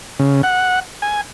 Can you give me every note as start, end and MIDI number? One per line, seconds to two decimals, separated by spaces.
0.19 0.42 49
0.43 0.80 78
1.02 1.21 80